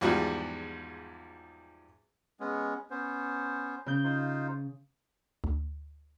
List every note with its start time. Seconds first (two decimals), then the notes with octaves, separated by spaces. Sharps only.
0.01 E2 G#2 F3 G3 F#4 G#4
2.40 G#3 B3 C#4
2.90 B3 C#4 C5
3.86 C#3 G6
4.04 D#4 F4 C5
5.44 D2